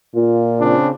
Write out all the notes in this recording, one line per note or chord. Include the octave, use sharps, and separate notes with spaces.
A#2 F4
C#3 C4 D4